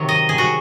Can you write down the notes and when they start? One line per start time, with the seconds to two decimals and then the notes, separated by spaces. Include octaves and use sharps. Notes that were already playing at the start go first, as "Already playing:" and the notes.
Already playing: C3 D#3 F#3 C#5
0.09 D#5
0.29 G#4
0.38 F#4